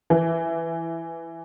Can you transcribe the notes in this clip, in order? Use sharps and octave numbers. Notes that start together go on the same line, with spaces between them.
E3